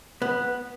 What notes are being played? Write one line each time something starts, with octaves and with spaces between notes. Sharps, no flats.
B3